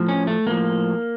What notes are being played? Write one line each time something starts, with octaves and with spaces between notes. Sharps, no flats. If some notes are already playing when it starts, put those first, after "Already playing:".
Already playing: A2 F3
C#4
A3
A2 F3 A#3